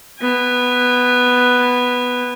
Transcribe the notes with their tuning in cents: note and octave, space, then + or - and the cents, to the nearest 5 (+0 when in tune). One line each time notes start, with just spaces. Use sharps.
B3 +0 G#5 -30